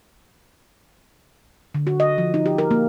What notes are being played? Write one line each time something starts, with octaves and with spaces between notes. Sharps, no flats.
D3
F#4
D#5
F3
D#4
G4
A#4
A#3